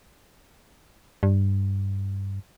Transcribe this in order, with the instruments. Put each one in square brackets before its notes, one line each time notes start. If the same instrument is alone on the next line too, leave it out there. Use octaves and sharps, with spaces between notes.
[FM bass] G2